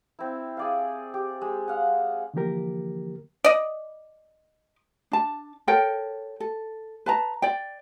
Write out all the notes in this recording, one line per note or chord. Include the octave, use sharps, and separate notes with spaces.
C4 E4
G#4 D5 F5
G4
G#3
F5 F#5
D3 E3 F3 A#3 G4 A#4
D5 D#5
D4 A5
A4 A#4 C#5 G5
A4
B4 A5 A#5
D5 G5